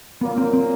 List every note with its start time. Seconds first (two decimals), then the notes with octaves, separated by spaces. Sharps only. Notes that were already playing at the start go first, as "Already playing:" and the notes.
0.21 A#2 F#3 A#3 B3
0.38 C4
0.53 C4